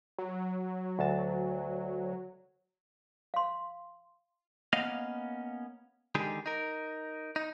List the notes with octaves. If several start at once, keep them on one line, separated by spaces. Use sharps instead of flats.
F#3
D2 A5
F5 C6
A#3 B3 C#4 D#5 F5
D3 D#3 G#3 G4 G#4
D#4 A#4
D#4